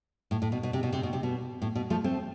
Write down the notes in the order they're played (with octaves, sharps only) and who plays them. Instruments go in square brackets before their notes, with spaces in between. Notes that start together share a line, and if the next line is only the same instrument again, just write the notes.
[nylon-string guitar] A2
A2
B2
B2
C3
B2
C3
B2
C3
B2
A2
B2
F3 A3
A3 C4